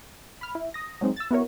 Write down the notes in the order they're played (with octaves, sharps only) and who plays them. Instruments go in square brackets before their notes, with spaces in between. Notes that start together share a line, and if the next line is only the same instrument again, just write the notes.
[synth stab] B5 F6
E4
D#6 A#6
F#3 G#3 C4 D#4
E6 A6
B3 E4 F#4 A#4 C#5